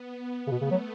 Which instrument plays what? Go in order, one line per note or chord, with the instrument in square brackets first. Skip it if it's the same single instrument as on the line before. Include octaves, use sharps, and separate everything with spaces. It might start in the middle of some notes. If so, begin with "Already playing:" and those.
Already playing: [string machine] B3
[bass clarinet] C#3
[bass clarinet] B2 [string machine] A3
[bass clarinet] C#3
F#3